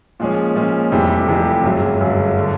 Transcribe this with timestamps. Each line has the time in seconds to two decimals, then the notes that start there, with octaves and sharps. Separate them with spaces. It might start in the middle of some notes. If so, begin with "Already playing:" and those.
0.20 A#2 F3 G#3 C#4
0.55 A#2 F3 G#3 C#4
0.92 F1 F2 C3 E3 G3
1.28 F1 F2 C3 E3 G3
1.63 G1 F#2 C#3 F#3
2.00 G1 F#2 C#3 F#3
2.39 D3